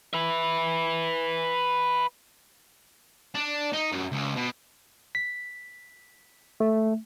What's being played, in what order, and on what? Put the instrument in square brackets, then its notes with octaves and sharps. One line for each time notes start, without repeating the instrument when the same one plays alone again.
[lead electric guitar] B4 E5
[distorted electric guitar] D4
D#4
F#2
C#2
B2
[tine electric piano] B6
A3